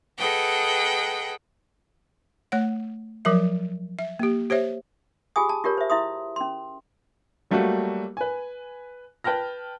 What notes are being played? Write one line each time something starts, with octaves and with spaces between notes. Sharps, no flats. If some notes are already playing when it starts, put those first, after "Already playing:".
G#4 A4 B4 D#5 F#5 G5
A3 C#5 F#5
F3 F#3 A#4 E5
E5
A#3 G4
G4 C5 C#5 E5
F4 G4 G#4 G#5 D#6
A5
F4 G4 A#4 C#5
C5 E5
E4 E5 C6 D#6
C#4 C6
F#3 G3 A3 A#3 F#4
B4 G#5
B4 G5 A5 F6 A#6